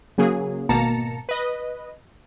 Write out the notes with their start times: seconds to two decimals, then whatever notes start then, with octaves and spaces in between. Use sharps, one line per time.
0.18 C#3 F#3 A#3 G#4
0.69 G#1 B2 A#3 A5 A#5 C#7
1.29 B4 D#5